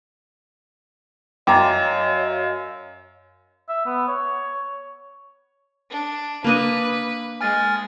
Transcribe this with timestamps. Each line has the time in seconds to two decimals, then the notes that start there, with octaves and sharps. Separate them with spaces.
1.47 F#2 C#5 D#5 F5 G5 A#5 D6 A6
3.69 E5
3.86 B3
4.08 C#5
5.90 D4
6.44 A#3 D4 B4 D#5
7.41 G#3 G#5 F6 A6